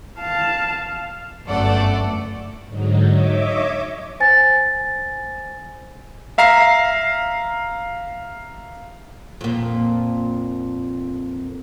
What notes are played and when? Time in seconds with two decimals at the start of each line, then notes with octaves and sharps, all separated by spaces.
0.20 F5 A5
1.46 G1 F#2 A3 A4 D5 F#5
2.67 G#2 D3 F#3 D#4
3.07 C#5 D#5 E5 D6
4.20 C5 G#5 A6
6.38 E5 F5 A#5 C7
9.41 F2 A#2